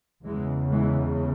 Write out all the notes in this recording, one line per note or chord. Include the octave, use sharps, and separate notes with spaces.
E2 C#3 E3 G#3
E3 G#3